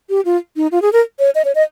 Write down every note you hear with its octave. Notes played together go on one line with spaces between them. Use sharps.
G4
F4
D#4
F4
G#4
A#4
C#5
D#5
C#5
D#5